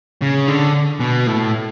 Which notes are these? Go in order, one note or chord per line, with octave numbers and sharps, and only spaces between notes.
C#3
D3
B2
A2